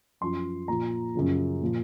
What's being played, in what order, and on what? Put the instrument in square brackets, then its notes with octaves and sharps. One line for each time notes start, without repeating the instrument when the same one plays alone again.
[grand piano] F#2 F3 C6
A#2 F3 A#5
F#2 C#3 F3
A#2 F3